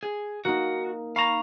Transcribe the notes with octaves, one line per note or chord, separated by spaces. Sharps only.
G#4
A#3 D#4 F#4
F5 A#5 B5 C#6 E7